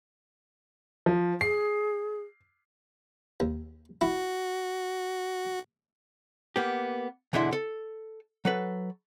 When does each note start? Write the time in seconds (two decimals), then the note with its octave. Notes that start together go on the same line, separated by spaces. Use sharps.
1.06 F3
1.41 G#4 C7
3.40 D#2
4.01 E4 F#4
6.56 A#3 B3 G4
7.33 E2 B2 D3 E4 E5 C6
7.53 A4
8.45 F#3 A4 B4